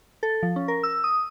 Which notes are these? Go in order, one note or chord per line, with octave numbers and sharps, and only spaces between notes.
A4
F3
C#4
A#4
E6
D#6